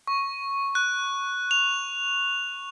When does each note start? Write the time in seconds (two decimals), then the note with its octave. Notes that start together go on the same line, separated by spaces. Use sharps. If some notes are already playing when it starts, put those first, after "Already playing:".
0.07 C#6
0.75 F#6
1.51 F7